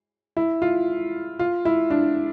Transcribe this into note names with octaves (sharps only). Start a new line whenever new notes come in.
E4
F4
F4
E4
D4